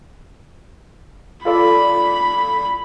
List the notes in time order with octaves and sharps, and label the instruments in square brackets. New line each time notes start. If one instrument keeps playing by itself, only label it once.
[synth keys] F4 A4 D5 [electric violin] B5